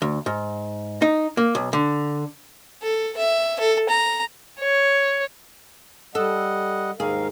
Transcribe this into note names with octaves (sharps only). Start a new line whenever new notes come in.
D2
G#2
D#4
A#3
B1
D3
A4
E5
A4
A#5
C#5
G3 A4 D#5 F#5
D#2 G#2 G#4 A#4 F5